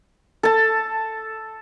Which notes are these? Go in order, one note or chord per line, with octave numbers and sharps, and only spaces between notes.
A4 A5